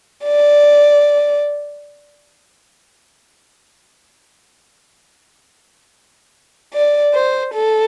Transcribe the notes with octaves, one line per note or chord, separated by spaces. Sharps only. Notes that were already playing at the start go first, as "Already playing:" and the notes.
D5
D5
C5
A4